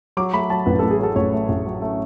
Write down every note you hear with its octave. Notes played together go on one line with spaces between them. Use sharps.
F#3 D6
A3 B5
F#3 A5
A1 B4
A4
A1
G#4
F#3 A4
A1 C#5
A3
A1
F#3
A3